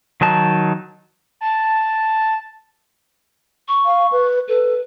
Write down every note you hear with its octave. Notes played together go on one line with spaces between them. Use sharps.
D#3 F#3 D#4 A5
A5
C#6
F5
B4
A4 B4